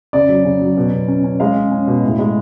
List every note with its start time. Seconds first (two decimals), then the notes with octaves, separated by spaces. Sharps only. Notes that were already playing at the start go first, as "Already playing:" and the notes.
0.13 C#3 D5
0.29 F#3
0.45 C#3
0.61 F#3
0.77 B2
0.92 B2
1.08 C#4
1.24 C#4
1.40 G#3 F5
1.56 C#4
1.71 C#4
1.87 B2
2.04 A2
2.19 G#3